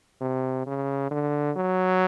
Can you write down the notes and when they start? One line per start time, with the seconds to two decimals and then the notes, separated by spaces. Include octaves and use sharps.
0.21 C3
0.66 C#3
1.11 D3
1.57 F#3